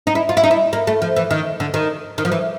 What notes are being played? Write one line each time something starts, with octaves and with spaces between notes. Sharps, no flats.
D#4
E4
F4
E4
D#4
E4
A#3
A3
F3
E3
D#3
D3
D#3
D#3
F3
E3